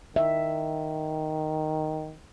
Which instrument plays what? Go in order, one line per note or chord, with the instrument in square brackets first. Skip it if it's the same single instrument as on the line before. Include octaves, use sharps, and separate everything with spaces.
[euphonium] D#3 [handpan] E5